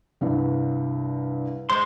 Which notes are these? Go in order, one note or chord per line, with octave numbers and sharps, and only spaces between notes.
C2 G2
G#3 C5 C6